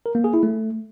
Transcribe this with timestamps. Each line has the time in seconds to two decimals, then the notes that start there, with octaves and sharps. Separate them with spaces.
0.06 A#4
0.15 A#3
0.24 G#4
0.34 E4
0.43 A3